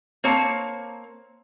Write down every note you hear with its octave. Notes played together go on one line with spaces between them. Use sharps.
A#3 C4 C#5 A5 A#5